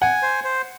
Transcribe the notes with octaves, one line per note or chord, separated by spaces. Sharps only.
F#5 G#5
C5
C5